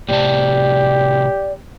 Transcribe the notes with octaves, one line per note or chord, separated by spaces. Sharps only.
A2 C3 G4 D5 A5